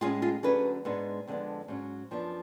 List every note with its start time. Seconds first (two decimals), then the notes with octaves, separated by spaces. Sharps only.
0.01 A2 G#3 C#4 F4 G#4
0.22 F4 G#4
0.43 D2 D3 F#3 A3 C#4 G#4 B4
0.85 G#2 G#3 B3 D4
1.27 F2 D3 G#3 B3 D4
1.68 G#2 F#3 C#4
2.11 F#2 F3 B3 D4